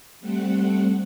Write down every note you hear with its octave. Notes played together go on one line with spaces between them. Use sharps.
G3 A3 C4 F#5